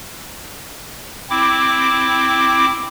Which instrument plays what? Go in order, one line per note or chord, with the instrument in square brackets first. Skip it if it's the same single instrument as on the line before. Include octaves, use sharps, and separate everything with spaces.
[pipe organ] C4 E4 D6